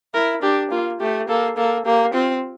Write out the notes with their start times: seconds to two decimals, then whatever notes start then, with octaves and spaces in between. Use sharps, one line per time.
0.14 E4 A#4
0.43 D4 G4
0.71 A#3 F4
1.00 A3 G4
1.29 A#3 A4
1.57 A#3 A4
1.86 A#3 G4
2.14 C4 F4